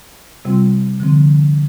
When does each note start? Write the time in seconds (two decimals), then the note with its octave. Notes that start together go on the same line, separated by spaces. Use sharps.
0.45 C3 G3 C4 F4
1.00 D3 F3 C4